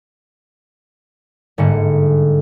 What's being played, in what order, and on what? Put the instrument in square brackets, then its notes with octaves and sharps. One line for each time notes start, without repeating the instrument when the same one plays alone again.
[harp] G1 G#2 D3 A#3 C#7